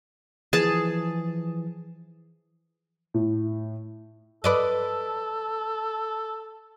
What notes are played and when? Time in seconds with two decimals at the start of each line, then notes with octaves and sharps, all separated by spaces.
0.53 E3 F3 G#4 A5
3.14 A2
4.44 A4 B4 D5 D#5